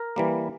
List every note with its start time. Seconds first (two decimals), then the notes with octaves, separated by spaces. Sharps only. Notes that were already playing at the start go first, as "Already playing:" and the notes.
Already playing: A#4
0.16 E3 G3 A#3